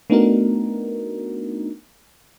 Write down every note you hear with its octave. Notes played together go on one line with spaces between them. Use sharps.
A3 B3 D4 D#4 F#4 A#4